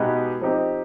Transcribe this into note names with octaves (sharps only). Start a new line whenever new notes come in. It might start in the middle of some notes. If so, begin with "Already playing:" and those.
Already playing: B2 G#3 B3 D#4 G4
F3 C4 D#4 G4